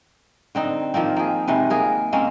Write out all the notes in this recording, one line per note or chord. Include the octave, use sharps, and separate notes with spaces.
D3 C4 D#4
D#3 F3 A#3 C4
A#3 G#4
C3 D#3 G#3 B4
A#3 G#4 A#4
G#3 A#3 C4 C#4